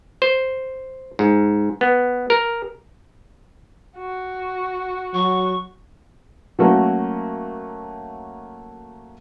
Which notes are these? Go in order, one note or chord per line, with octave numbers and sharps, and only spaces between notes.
C5
G#2
B3
A#4
F#4
F#3 C#6
F#3 A3 A#3 C#4 F#4